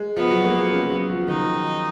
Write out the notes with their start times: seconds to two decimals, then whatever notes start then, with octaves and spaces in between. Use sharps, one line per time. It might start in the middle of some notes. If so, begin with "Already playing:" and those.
Already playing: G#3
0.17 F3 B3
0.31 F#3
0.45 A#3
0.59 G#3
0.72 C#3
0.90 F#3
1.10 F3
1.21 F3
1.28 D#3 D#4